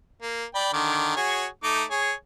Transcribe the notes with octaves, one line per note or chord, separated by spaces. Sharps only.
A#3
D5 G5 B5
D3 D#3 D6
F#4 G#4 C#5
A3 D#4 D6
G#4 C#5